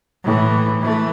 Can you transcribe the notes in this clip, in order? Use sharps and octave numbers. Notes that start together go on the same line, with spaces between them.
A2 E3
E3 A3